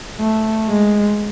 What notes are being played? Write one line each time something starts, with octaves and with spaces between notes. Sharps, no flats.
A3
G#3